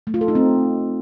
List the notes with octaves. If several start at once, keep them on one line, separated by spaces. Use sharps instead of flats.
A3
F4
A4
D#4
C4